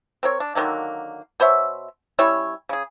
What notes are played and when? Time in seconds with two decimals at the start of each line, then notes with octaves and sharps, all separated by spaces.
0.23 C4 A#4 C#5
0.40 D4
0.55 D3 D#3 F#3 A#3
1.40 B2 C5 C#5 E5
2.19 G3 C#4 E4 C#5
2.69 C#3 G#4